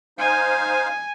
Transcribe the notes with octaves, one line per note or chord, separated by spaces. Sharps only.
D#4 C5 F5 G#5